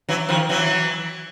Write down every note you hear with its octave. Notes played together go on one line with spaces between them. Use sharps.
E3 F#3
D#3 F3
E3 F#3